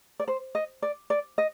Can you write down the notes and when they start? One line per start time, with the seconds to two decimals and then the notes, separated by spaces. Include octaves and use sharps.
0.20 D5
0.28 C5
0.55 D#5
0.82 D5
1.10 D5
1.38 D#5